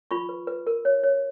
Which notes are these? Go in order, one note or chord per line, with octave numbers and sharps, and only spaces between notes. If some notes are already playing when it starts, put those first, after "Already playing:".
F4 B5 C#6
B4
B4
A#4
C#5
C#5